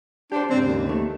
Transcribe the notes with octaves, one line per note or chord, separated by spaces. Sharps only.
D4 G4 C5
G#2 C#3 C4 D4
D#2
D#3 A3